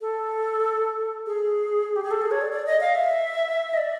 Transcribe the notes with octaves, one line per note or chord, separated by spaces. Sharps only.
A4
G#4
G4
G#4
A4
G#4
C#5
D5
D5
D#5
F5
E5
D#5
D5